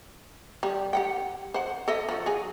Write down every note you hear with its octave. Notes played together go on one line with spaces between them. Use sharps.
G3
G4 F#5 G5
C5 F#5
A4 D#5 E5
F3 F#4
F#3 G#4